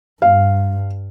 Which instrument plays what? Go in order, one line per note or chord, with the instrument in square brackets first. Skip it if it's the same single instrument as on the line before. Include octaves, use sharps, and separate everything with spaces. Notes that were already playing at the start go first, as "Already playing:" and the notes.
[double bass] G2 [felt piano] F5